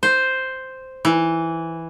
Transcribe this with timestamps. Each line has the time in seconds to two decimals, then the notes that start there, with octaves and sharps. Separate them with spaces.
0.03 C5
1.05 E3